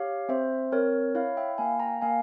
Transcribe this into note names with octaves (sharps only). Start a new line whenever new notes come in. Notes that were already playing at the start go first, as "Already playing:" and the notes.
Already playing: G4 C#5 F5
C4 C5 E5
C4 A#4 C#5
E4 C#5 F5
E5 G5
A#3 F5 G#5
G5 A#5
A#3 F5 G#5